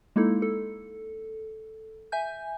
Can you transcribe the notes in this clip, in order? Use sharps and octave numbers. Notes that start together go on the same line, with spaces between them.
G#3 A#3 D#4 E4 A4
A4
E5 G#5 G6